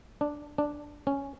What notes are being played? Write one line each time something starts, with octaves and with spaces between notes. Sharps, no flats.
D4
D4
C#4